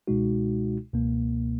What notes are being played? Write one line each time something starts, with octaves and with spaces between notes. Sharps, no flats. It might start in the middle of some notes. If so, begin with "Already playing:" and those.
C#2 B2 G#3 D#4 F#4
C#2 B2 A#3